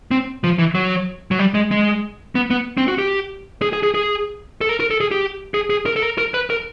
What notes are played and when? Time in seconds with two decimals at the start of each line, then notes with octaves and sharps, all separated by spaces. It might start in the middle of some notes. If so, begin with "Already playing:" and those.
0.11 C4
0.44 F3
0.59 E3
0.75 F#3
1.31 F#3
1.39 G3
1.54 G#3
1.71 G#3
2.35 B3
2.50 B3
2.77 C4
2.88 F#4
2.98 G4
3.62 G#4
3.73 G#4
3.83 G#4
3.95 G#4
4.61 A4
4.69 A#4
4.80 A#4
4.91 A4
5.00 G#4
5.11 G4
5.54 G#4
5.70 G#4
5.86 A#4
5.96 A4
6.02 A#4
6.18 A#4
6.34 B4
6.50 A#4